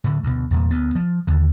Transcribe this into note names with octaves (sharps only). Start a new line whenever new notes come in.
A2 D3
D2 B2
E2 A#2
D2 B3
F3
D#2 D3